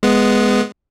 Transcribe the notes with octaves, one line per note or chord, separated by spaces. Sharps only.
G#3 B3